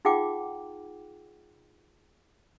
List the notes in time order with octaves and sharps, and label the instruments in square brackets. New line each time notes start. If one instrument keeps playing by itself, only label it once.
[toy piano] D#4 F4 G#4 F#5 G5 D6